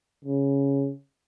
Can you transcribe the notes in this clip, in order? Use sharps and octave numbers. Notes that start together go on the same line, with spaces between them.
C#3